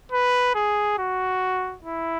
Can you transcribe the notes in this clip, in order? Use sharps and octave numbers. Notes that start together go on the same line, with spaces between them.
B4
G#4
F#4
E4